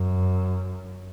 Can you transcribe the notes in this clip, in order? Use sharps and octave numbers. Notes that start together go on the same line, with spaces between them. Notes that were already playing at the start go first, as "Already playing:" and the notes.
Already playing: F#2